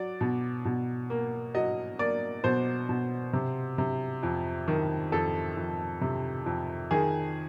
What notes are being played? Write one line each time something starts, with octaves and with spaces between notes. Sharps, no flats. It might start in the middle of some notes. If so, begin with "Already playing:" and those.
Already playing: F#3 D5
B2
B2
A#3
F#3 D#5
A#3 D5
B2 C5
B2
C3
C3
F2
D#3
F2 A4
F2
C3
F2
D#3 G#4